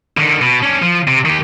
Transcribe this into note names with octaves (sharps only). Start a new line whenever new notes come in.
D3 D#3
B2
C#4 D4
F3
C3
D#3 G4